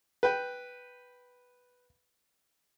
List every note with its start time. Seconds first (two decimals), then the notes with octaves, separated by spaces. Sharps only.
0.23 B4 G5